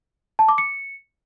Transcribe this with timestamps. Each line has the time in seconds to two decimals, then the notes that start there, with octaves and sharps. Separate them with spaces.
0.39 A5
0.49 D6
0.58 C#7